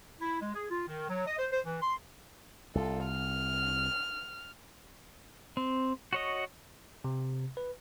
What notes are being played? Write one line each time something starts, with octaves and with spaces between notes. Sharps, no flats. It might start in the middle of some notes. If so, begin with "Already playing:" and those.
E4
G#3
G#4
F4
D#3
F#3
D#5
C5
C5
E3
C6
C2 F4 A4
F6
C4
F#4 C#5 D#5
C3
B4